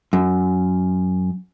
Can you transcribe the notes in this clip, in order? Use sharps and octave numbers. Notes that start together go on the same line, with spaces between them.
F#2